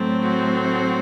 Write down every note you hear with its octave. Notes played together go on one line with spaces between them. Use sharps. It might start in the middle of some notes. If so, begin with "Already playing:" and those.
Already playing: A2 F#3 A3 C4
F#4